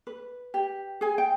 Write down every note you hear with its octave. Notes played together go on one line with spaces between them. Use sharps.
B4
G4
G#4 G#5
G5